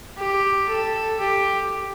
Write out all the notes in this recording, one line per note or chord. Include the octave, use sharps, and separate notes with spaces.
G4
A4
G4